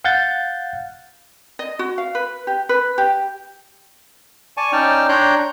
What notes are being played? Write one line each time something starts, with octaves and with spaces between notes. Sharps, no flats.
F5 F#5 G6 A6
D#5
F#4
F5
B4
G4
B4
G4
D5 G#5 A5 C#6
C#4 D#4 D5 G5 A5 F6
D4 C#5 G5 A#5 C6 F#6